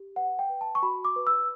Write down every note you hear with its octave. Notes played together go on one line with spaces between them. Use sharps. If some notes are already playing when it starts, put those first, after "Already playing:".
Already playing: G4
B4 F#5
G5
B4
A5
C#6
F#4 B5
D6
B4
E6